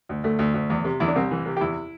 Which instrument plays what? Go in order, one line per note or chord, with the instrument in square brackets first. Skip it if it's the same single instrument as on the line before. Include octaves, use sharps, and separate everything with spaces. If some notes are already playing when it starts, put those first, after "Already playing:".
[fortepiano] D2
D2 A3
D2
D2
E2
C3
E2 E4
D4
C2 C4
E3
C3
G4
E2 E4